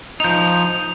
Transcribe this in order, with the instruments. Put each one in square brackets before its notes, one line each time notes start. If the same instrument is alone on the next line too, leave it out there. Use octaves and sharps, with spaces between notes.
[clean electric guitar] F3 D#4 [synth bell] G6 F7